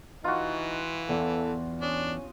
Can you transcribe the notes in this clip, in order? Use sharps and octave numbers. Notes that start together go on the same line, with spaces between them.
E3 D#4 F4 F#4
E2 A4
C#4 D4 D#5